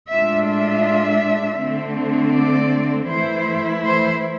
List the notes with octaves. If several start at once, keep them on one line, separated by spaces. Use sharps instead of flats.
A2 G#3 D4 F4 E5
E5
D3 A3 C4
D5
E3 A3 E4 C5
C5